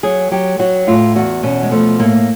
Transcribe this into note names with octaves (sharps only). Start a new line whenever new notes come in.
F#3 G#4
F#3 G4
F#3 F#4
A2 F4
E2 F#4
B2 C#4
G#3
F3 A3
A2 A#3